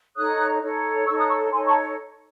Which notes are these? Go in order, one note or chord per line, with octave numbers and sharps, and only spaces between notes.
D#4 A4 C#5 D#6 F#6
D#4 A4 C#5
D#4 A4 C#5 C#6 E6
D#6 F#6
C#6 E6
D#4 A4 C#5 G#5 C6
A5 C#6